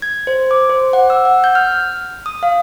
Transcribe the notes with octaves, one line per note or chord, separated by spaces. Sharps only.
G#6
C5
D6
C5
F#5
E6
F#5
G6
F6
D#6
F5